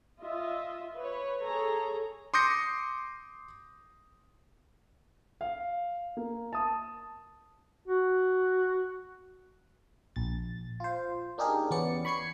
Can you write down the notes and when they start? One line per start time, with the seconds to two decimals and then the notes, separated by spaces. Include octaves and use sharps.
0.21 F4 D#5 E5
0.96 B4 C#5
1.42 G#4 A4 C#5 A#5
2.34 C6 D6 D#6 G6 A#6 C#7
5.41 F5
6.17 A#3
6.53 A5 D#6
7.87 F#4
10.16 A#1 A6
10.80 F4 C5
11.38 A#3 D4 D#4 G4 G#4 A#4
11.71 E2 B3 C#4 D5 C#7
12.05 B5 C#6 G#6 C7 C#7